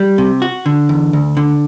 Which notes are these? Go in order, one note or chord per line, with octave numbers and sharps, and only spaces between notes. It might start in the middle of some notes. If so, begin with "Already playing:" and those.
Already playing: G3
C3
F#4
D3
E2
D2
D3